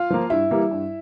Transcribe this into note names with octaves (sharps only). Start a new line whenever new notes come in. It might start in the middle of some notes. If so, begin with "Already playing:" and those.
Already playing: F4 F5
F3 A#3
G2 E4 E5
E3 G3 A#3
G2